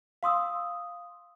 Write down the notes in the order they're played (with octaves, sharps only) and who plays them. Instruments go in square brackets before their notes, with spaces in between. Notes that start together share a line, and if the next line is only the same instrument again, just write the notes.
[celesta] F5 C6 D#6 E6